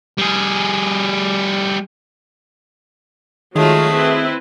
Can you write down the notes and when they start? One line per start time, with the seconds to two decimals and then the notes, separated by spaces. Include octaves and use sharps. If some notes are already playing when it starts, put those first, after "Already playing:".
0.18 G3 G#4
3.56 D#3 F#3 G#3 A3 F4 F#4 G#4
3.93 C4 E4 B4